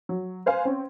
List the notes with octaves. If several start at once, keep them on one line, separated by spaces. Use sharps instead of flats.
F#3
B4 C5 F5 G#5
C4 C#4